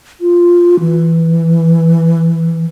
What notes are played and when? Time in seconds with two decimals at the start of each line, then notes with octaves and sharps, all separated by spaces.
0.21 F4
0.80 E3